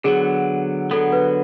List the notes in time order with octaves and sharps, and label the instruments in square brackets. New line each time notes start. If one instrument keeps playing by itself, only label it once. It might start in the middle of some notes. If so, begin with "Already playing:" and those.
[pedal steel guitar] D3 F#3 B3 [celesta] G#4
[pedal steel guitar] D3 F#3 B3 [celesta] A4
[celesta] B4